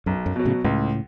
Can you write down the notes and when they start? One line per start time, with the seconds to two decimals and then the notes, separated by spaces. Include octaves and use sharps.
0.06 B1 F#2
0.26 F#2
0.36 B2 F#3
0.45 A2 C#3
0.64 C#2 A2 C#3